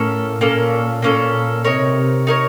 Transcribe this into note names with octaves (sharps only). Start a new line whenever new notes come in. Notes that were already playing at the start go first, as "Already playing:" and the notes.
Already playing: A2 A#3 C#4 A4
A#2 A#3 C#4 A4
A#2 A#3 C#4 A4
C3 D#4 A#4 C#5
D#4 A#4 C#5